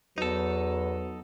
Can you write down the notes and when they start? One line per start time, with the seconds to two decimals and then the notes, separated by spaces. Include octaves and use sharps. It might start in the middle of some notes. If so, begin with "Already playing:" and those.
0.18 E2 F#3 D#4 A4 B4